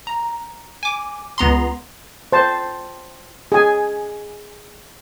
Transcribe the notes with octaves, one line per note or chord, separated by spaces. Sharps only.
A#5
G#5 D6
C#2 B3 A#5 C6
C5 A5
G#4 G#5